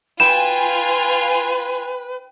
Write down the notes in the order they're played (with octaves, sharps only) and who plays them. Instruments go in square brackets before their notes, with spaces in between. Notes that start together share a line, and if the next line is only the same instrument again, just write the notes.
[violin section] F4 G#5 [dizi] B4 [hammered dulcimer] G5 B5 [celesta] E7